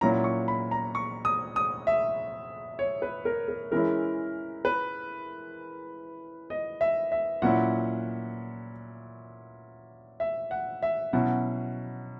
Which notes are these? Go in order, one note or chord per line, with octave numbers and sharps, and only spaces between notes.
A#2 F#3 C#4 E4 A#5
C#6
B5
A#5
C#6
D#6
D#6
E5
C#5
B4
A#4
A#4
E3 G#3 C#4 E4 A#4
B4
D#5
E5
E5
A#2 F#3 C#4 E4 F#5
E5
F#5
E5
B2 F#3 C#4 E4 F#5